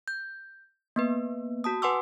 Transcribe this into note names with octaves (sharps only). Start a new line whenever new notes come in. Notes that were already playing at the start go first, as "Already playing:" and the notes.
G6
A#3 B3 B4
F#4 A5 D#6
B4 F#5 G#5 C6 D6 E6